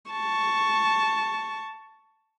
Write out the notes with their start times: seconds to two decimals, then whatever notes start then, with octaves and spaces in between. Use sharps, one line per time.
0.11 A5 C#6